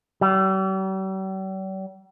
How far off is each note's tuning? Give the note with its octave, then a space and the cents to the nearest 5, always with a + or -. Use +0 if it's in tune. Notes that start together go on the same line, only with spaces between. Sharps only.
G3 -45